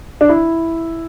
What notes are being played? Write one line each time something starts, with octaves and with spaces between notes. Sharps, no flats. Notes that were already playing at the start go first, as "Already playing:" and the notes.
D4
E4